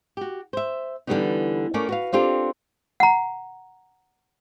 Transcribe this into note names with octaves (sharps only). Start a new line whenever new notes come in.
F#4 G4
C5 E5
D3 E3 G3 B3 D4 D#4
A3 A#3 C#4 A#4 D5
F#4 B4 F5
C4 D4 F4 G4 A4
F#5 A#5